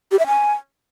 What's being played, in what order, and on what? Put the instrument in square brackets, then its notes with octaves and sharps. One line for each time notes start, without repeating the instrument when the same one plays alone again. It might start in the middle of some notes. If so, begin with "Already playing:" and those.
[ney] G4
E5
G#5